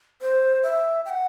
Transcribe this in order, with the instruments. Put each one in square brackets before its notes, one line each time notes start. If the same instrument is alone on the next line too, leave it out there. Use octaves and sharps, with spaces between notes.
[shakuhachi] C5
E5
G5
F#5